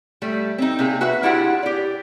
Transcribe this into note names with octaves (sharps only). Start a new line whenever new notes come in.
G3 A3
C4 D#4
C3 A#3 G#4
F#4 B4 E5
D4 E4 F4 G4 G#4 F#5
G4 D5